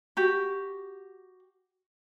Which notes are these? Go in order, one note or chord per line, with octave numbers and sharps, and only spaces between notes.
F#4 G4